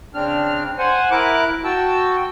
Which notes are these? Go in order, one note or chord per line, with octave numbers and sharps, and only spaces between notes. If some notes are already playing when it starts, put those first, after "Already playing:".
C#3 C4 D4 F6
C5 F#5 G#5
E4 A#4 D6 F#6
F#4 G5 A5 E6